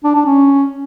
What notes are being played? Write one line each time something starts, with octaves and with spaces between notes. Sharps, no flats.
D4
D4
C#4